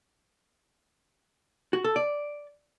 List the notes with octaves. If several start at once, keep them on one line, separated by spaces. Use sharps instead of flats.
F#4
A4
D5